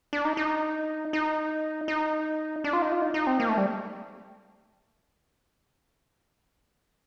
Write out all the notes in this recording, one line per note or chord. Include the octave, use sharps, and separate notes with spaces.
D4
D#4
D#4
D#4
D#4
D4
F4
D#4
F4
D#4
D#4
C4
A#3
A3
G3